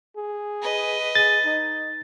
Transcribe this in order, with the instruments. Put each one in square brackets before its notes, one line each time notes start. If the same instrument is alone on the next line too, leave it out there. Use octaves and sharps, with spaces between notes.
[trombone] G#4
[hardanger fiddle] B4 D#5
[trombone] G#4 [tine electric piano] A6
[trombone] D#4